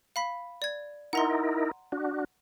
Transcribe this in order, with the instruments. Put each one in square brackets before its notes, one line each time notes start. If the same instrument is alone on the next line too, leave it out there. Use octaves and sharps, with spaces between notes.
[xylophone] F5 B5 B6
D5 G#6
[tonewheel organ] D#4 E4 A#4 [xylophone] F#5 A#5 C6
[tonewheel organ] D4 F#4